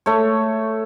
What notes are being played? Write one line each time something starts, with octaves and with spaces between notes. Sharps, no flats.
A3 C#5